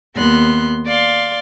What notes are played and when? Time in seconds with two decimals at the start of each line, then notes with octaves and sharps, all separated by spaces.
0.14 D#2 B3 C6 F#6
0.86 D5 F5 C6